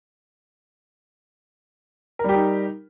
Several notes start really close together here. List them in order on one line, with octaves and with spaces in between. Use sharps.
A#4 G3 G4 D#4